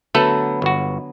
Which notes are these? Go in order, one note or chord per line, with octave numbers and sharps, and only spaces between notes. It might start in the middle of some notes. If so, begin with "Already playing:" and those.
D3 F#3 A3 B3 A4 B4
G1 F#4